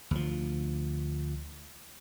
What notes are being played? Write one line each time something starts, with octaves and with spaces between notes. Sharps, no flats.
D2 F3